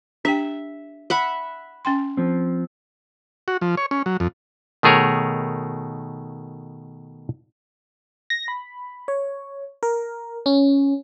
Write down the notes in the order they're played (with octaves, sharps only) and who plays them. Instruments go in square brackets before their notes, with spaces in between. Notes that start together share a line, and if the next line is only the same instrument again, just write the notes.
[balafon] D4 G4 G5 [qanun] E5
[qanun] E5 F#5 B5
[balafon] C#4 G5 C6
[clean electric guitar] F3 C4
[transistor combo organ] F#4
F3
C#5
C#4
F#3
F2
[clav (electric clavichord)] B2 D#3 A3 G#4 A#4 C#5
[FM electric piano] A#6
B5
C#5
A#4
C#4